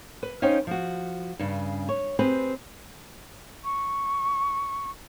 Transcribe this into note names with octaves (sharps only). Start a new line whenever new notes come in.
B4
C#4 D#4 C5 F5 G5
F3 F#4
G2 C#3
C#5
C4 G4 G#4 B4
C#6